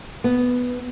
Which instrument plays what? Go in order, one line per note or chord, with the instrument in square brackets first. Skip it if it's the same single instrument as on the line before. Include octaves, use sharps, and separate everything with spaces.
[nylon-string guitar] B3